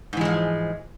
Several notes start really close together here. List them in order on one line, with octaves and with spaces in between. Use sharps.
G#2 E3 G#3 F3